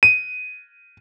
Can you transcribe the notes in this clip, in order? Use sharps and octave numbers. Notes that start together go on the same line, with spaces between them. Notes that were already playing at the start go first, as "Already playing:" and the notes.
D#7